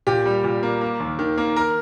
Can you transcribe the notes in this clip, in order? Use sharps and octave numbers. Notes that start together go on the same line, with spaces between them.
A#2 G4
G3
A#2
A#3
A#3
D#2
D#3
A#3
A#4